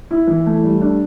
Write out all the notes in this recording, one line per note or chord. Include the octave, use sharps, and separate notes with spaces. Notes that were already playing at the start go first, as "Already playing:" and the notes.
E4
E3
A3
G3
D4